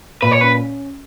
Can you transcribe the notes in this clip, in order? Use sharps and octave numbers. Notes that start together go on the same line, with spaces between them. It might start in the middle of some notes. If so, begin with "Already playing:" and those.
A#2 B4
C#5
C#4 B4